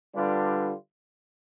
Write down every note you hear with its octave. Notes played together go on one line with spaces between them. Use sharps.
D3 G3 D4 F4 B4